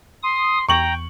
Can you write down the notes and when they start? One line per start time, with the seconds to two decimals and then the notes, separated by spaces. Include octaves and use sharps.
0.23 C6 D#6
0.69 E2 G5 A#5 C#6 F#7